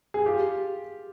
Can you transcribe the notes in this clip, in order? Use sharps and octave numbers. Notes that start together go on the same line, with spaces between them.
G#4
F4 G4